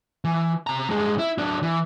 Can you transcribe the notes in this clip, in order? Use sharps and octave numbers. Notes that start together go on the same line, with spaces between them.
E3
C3 A#5
G2 G#3
E4
F#3 D4
E3